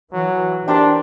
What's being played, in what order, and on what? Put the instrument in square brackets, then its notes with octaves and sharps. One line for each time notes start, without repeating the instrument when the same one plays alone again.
[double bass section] E3 [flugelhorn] F#3
[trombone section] D4 [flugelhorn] G4 [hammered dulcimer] A#4 C5 G5